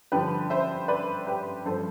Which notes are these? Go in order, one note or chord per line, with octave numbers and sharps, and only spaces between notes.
G2 D3 F3 G4 B4
C5 E5
B4 D5
G4 B4
G2 F3 A4 C5